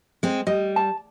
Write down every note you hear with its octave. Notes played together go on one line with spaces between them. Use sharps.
G#3 C4
G3 D#5
A5